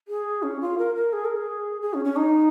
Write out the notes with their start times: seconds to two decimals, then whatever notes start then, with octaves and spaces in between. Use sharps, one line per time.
0.08 G#4
0.43 C#4
0.61 F4
0.78 A#4
0.95 A#4
1.13 G#4
1.25 A#4
1.37 G#4
1.82 G#4
1.94 C#4
2.05 C#4
2.16 D#4